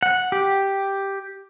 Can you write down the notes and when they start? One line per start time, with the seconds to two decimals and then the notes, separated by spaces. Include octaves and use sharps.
0.03 F#5
0.32 G4